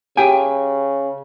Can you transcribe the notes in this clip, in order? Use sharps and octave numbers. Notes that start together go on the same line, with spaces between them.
C#3 G4 G5 G#5